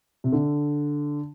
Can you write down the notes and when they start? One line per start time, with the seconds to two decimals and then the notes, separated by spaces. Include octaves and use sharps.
0.24 C3
0.32 D3